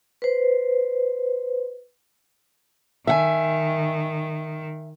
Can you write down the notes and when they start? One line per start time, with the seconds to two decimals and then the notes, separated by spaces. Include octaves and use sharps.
0.22 B4 C5
3.07 D#3 E5 F#5 G#5